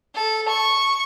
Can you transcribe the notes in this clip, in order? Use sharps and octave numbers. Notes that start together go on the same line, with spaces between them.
A4
C#6